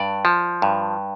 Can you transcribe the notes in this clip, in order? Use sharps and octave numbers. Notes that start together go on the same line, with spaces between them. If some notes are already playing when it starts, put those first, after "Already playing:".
Already playing: G2 D5
F3
G2